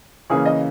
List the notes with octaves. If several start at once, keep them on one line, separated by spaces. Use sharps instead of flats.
C#3 E3 A#3 C#4 G#4
D#5